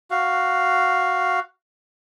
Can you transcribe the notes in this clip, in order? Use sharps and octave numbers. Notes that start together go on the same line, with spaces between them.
F#4 F5